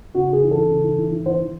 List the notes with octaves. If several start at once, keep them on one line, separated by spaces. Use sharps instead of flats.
C#3 F#4
C#3 G#4
E3
A4
E3
C#3
E3
E3
E3
E3 C5
E3